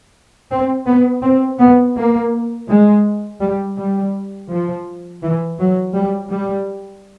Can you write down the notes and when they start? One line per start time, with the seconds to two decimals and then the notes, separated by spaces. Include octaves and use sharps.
0.50 C4
0.86 B3
1.22 C4
1.58 B3
1.94 A#3
2.67 G#3
3.40 G3
3.77 G3
4.49 F3
5.22 E3
5.58 F#3
5.95 G3
6.31 G3